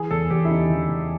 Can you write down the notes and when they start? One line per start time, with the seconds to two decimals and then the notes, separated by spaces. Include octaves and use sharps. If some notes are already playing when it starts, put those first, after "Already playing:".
Already playing: E3 G#4
0.11 E2 A4
0.30 E2 G4
0.45 E4
0.50 C#3 D#4
0.70 E3
0.89 E2